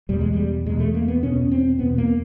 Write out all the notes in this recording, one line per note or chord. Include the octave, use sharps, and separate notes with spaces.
E2 B2 G3
G#3
G3
E2 B2 G#3
A3
A#3
B3
E2 B2 C#4
C4
E2 B2 B3
A#3